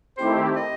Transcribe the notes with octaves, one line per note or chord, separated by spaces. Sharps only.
D#3 A3 C4 E4 G4 C5
D#5